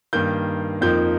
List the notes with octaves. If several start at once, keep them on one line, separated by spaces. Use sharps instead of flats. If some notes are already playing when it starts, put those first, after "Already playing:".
G2 D#3 A#3 G6
F2 F3 A#3 D#4 G6